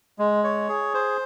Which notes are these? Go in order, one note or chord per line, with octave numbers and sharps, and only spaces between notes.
G#3
C#5
G#4
C5